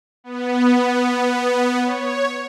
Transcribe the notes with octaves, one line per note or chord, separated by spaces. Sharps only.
B3
C#5